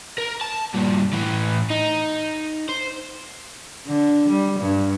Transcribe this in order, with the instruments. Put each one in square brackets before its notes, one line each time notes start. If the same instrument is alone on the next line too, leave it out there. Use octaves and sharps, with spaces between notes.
[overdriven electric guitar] A#4
A5
G2 A#2
A2 E3
D#4
C5
[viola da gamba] D3
G3
G2